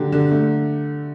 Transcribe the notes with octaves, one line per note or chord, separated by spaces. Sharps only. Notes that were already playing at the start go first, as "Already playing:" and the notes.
Already playing: D3 F#3 A#3 G4
D3
A3